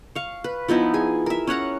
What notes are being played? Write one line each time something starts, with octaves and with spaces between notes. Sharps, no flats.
F5 C#6
B4
F3 B3 D#4 E4
G#4 G#5
A#4 E5
C#4 C#5 F#5 A#5